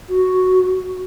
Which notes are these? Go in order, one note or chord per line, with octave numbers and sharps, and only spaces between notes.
F#4